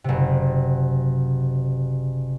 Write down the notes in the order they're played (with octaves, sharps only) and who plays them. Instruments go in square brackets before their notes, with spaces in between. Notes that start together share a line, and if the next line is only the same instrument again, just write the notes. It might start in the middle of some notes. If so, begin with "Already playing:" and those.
[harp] F#1 C3